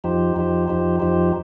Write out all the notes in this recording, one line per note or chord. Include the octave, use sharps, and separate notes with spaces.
F2 F3 D#4 G4 C5
F2 F3 D#4 G4 C5
F2 F3 D#4 G4 C5
F2 F3 D#4 G4 C5